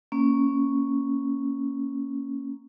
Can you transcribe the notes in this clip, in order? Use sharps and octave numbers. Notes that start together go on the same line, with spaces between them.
A#3 C#4